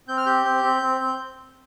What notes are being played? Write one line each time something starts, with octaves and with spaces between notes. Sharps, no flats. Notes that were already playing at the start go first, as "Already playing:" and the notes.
C4 G6
F6
G4 G6
C4
C4
C4
C4